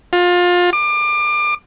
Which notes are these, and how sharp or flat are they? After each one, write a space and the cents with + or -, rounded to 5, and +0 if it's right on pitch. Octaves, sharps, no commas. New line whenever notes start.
F4 +25
D6 +30